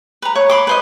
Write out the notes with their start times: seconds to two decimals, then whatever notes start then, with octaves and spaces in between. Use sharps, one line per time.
0.22 B4 A#5
0.35 C#5
0.49 B5 C6 D6
0.67 B4 C5 D#5